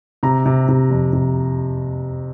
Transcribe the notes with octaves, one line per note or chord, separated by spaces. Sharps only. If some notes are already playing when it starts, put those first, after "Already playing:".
C3 A#5
C3
C3
F2
C3